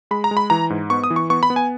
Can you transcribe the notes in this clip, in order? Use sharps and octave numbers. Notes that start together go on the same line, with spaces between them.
G#3 B5
A#5
G#3
B5
E3 A#5
G#2
B3 C#6
D#6
E3
C#6
B3 C#6
B5
B3
G#5